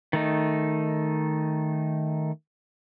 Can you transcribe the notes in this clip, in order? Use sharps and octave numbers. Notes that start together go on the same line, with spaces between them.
D#3 A3 D#4